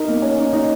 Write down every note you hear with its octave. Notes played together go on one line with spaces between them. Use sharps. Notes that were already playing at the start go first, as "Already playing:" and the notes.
Already playing: D#4 A#4
A#3
C#4
D#4
D#4